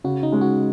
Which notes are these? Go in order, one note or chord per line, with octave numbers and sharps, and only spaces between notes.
C#3 F#4
D#4
G#3 C#4
F#4